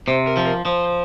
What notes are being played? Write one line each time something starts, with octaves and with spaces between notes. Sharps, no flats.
C3 C5
A#4
F3
A#4
F3 C5